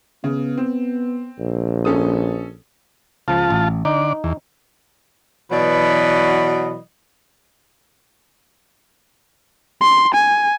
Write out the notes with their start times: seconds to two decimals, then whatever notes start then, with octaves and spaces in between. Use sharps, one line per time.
0.24 C#3 B3
0.58 C4
1.39 A#1
1.85 C#4 A4 D#6
3.28 C#2 F3 F4 A5
3.50 A1
3.85 D3 D#4 D5
4.24 E2
5.52 B2 E3 F#3 D5 D#5 B5
9.81 C6
10.14 G#5